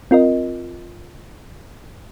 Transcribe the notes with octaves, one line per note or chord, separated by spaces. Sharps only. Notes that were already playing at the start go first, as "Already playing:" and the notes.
C4 F4 A#4 D#5